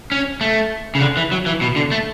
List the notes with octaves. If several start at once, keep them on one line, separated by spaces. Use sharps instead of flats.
C#4
A3
C#3
D3
E3
F#3
E3
B2
D3
A3